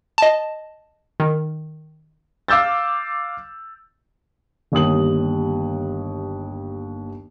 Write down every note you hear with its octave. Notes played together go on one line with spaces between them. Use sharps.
D#5 A5
D#3
F5 D6 E6 G6 A6
G1 D#2 G3 D#6 F#7